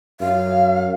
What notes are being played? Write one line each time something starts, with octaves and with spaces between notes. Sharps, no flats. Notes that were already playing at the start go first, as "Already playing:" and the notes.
F#2 F5